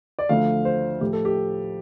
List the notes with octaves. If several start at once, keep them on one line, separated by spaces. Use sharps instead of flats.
D5
D2 D3 F3 A3 F5
C5
A2 F3 A3 G4
A4
G4